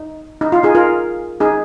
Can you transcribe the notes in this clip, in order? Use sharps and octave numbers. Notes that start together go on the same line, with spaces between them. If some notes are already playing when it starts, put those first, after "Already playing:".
Already playing: D#4
D#4
F4
D#4 G#4
F4 A#4
D#4 G#4